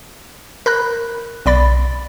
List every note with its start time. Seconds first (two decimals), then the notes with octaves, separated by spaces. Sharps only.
0.66 A#4 B5 F#6
1.46 B1 D5 B5 A6